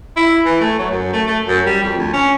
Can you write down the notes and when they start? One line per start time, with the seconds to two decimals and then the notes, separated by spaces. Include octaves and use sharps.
0.17 E4
0.45 E3
0.61 A3
0.79 F#3
0.91 F#2
1.13 A3
1.27 A3
1.46 F#2
1.66 G3
1.83 F2
1.98 D2
2.13 C#4